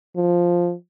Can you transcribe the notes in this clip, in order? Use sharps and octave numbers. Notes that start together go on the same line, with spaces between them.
F3